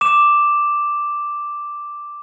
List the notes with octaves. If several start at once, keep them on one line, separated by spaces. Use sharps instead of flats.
D6 E7